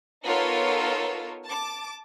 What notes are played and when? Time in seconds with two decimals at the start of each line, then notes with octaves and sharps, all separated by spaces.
0.24 B3 D#4 F4 A4 A#4 C#5
1.44 A5 D6